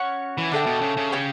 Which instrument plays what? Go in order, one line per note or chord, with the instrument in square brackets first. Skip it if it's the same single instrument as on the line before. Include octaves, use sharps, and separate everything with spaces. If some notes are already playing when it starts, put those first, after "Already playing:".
Already playing: [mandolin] C#4 F#4 C#5 F#5
[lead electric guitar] E3
[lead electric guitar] D3 [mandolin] D4 A4 E5 G5
[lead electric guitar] B2
C#3
C#3
[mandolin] C#4 G4 C#5 G5